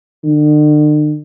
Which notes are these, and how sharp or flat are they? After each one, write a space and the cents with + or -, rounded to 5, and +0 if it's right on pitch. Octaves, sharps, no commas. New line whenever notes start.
D3 +45